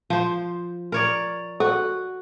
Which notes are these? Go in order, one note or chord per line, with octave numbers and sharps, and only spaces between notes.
F3 C5
A#4 C#5 D5
F#4 A4